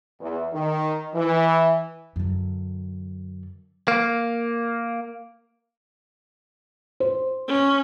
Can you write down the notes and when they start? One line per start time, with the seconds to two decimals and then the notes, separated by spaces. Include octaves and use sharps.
0.20 E2
0.53 D#3
1.15 E3
2.16 F#2 D3
3.88 A#3
7.00 C5
7.48 C#4